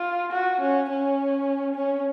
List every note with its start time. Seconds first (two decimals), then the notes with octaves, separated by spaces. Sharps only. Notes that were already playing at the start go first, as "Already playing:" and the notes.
Already playing: F4
0.32 F#4
0.60 C#4
0.89 C#4
1.75 C#4